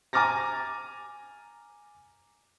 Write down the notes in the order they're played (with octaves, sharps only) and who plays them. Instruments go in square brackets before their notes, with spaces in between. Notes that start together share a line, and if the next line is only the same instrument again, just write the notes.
[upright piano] G#5 A#5 D6 F6 A6 A#6